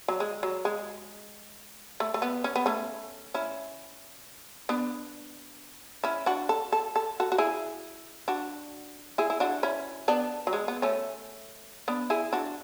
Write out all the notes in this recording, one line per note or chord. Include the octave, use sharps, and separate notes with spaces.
F#3
G#3
F#3
G#3
A3
A3
B3
C#4
B3
A3 C#4
C#4 E4
B3 D4
C#4 E4
D4 F#4
A4
A4
A4
F#4 A4
F#4
E4 G#4
D4 F#4
E4 G#4
E4
D4 F#4
C#4 E4
B3 D4
F#3
G#3
B3
A3 C#4
B3 D4
E4 G#4
D4 F#4